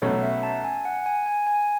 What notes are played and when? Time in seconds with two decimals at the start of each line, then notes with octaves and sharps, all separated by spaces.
0.02 B1 B2 A3 C#4 C#5
0.23 E5
0.43 A5
0.64 G#5
0.85 F#5
1.06 G#5
1.26 G#5
1.47 G#5